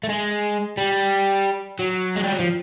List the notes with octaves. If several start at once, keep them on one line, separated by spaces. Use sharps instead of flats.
A3
G#3
G3
F#3
G#3
G3
F#3
F3